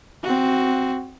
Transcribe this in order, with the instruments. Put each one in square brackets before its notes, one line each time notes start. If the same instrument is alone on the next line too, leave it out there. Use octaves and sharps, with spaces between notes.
[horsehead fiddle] C4 F#4